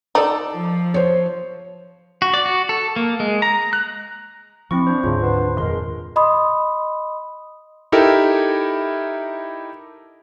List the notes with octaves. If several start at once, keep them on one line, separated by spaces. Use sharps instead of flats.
D#4 A4 D5
F3
C5 C#5
F#4
D5
F#4
A4
A#3
G#3
A#5
F#6
F3 C4 E4 C#6
D4 C5
D2 G#2 C#3 F#3 F4
B3 D4 C5
F2 A#2 D#3 G#3 A#4 C6
D#5 B5 C6 D#6
D#4 E4 G4 A4 A#4